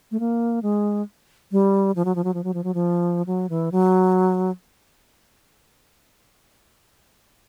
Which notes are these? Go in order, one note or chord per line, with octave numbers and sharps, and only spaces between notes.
A3
A#3
G#3
G3
F3
F#3
F3
F#3
F3
F#3
F3
F#3
F3
F#3
E3
F#3